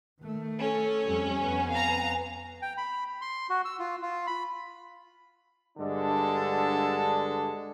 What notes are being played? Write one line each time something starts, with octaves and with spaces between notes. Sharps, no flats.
D#3 A3
C#4 A4
F2 G3
F2 B3 G#5
F5 A#5
G5
B5
C6
F#4
E6
F4
F4
B5
G2 D3 G#3 D4 A4